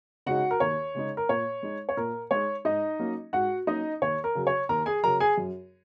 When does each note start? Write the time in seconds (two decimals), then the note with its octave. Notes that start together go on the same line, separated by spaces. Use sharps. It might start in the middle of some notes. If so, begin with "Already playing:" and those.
0.26 C#3 G#3 D#4 F#4 F#5
0.51 A#4
0.60 D#2 C#5
0.95 C#3 G#3 D#4
1.17 A#4
1.29 A#2 C#5
1.63 G#3 D#4
1.89 C#5
1.97 A#2 A#4
2.31 G#3 D#4 C#5
2.65 G#2 D#4 D#5
2.99 F#3 A#3 C#4
3.33 G#2 F#4 F#5
3.67 F#3 A#3 C#4 D#4 D#5
4.02 D#2 C#5
4.24 A#4
4.35 C#3 F#3
4.47 C#5
4.69 D#2 A#4 A#5
4.86 G#4 G#5
5.03 C#3 F#3 A#4 A#5
5.20 G#4 G#5
5.38 F#2